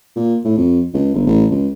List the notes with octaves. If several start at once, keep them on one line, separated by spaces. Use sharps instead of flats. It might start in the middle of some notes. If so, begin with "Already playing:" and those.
A#2
A2
F2
C#2
G1
A1
C#2